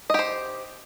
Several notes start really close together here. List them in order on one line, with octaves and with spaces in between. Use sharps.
D#5 G4 C5